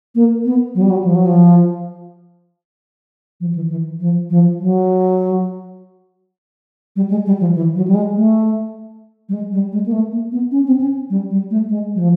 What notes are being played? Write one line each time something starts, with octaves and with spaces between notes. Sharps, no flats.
A#3
B3
F#3
G3
F#3
F3
F#3
F3
F3
E3
E3
F3
F3
F#3
G3
G#3
G3
F3
E3
F#3
G3
G#3
A3
G3
G#3
G3
G#3
A#3
A3
A#3
B3
C#4
C4
C#4
G3
G3
A3
G#3
F#3
F3